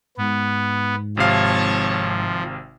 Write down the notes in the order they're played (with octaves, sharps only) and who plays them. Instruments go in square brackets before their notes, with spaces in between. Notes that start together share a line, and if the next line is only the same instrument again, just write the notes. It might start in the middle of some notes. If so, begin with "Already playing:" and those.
[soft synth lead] G#2 [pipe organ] B3
[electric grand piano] G#1 C3 F5 [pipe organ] F3 [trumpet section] C#5 A5